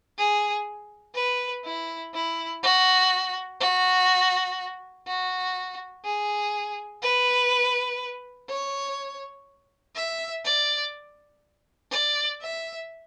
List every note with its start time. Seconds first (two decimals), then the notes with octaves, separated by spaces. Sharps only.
0.18 G#4
1.16 B4
1.65 E4
2.14 E4
2.63 F#4
3.61 F#4
5.07 F#4
6.05 G#4
7.02 B4
8.49 C#5
9.96 E5
10.45 D5
11.91 D5
12.41 E5